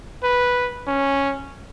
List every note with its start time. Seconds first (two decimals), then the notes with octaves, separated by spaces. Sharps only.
0.23 B4
0.87 C#4